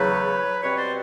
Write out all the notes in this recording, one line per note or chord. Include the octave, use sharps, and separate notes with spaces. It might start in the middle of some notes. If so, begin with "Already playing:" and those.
Already playing: E2 C#3 F#3 A3 B4 C#5
B2 G3 C4 B4 C#5
C5 D5